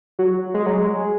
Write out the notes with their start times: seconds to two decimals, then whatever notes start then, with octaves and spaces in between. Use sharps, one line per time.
0.19 F#3
0.54 G#3
0.66 F#3
0.78 G#3